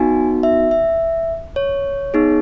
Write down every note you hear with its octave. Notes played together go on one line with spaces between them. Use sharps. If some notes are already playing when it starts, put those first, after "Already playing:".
Already playing: B3 D#4 F#4 G#5
E5
E5
C#5
B3 D#4 G#4